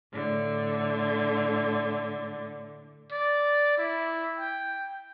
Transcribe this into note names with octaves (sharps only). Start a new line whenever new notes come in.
A2 D3
D5
E4
G5